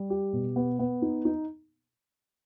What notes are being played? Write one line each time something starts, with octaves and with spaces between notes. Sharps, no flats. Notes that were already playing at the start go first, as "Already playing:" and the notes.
Already playing: G3
G4
B2
B3
B3
D#4
D#4